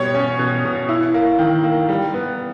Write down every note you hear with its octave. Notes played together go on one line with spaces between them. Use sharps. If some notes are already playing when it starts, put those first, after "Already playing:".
Already playing: B2 G3 C#5
C#4
B2
B2
E4
A#3
D#3
A#3
G3
B3